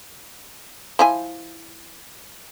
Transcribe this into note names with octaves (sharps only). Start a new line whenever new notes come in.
F3 E4 G#5